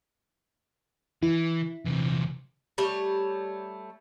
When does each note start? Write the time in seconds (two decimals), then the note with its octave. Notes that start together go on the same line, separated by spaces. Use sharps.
1.23 E3 E4
1.85 E2 C3
2.78 G3 A3 C#5